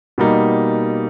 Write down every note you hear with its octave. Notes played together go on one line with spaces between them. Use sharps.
B2 G3 A#3 D#4